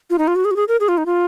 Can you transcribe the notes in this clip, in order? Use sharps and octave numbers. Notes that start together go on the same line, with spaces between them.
F4
D#4
F4
F#4
G#4
F#4
G#4
A#4
G#4
F4
D#4
F4